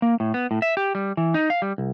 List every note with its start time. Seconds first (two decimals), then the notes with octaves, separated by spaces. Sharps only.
0.02 A#3
0.20 A2
0.34 B3
0.51 A2
0.62 E5
0.77 G4
0.95 G3
1.17 E3
1.34 D#4
1.50 F5
1.62 G3
1.78 C2